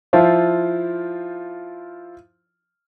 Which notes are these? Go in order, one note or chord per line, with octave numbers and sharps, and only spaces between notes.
F3 E4 F4 C5